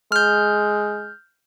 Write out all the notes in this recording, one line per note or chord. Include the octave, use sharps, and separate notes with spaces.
G#3 F6 G6